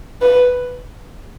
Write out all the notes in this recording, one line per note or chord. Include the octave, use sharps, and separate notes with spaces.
B4